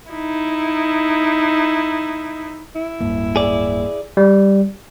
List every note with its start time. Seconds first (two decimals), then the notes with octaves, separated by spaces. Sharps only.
0.10 D#4 E4
2.76 E4
3.00 D1 G2 A#3
3.36 G#4 D5
4.17 G3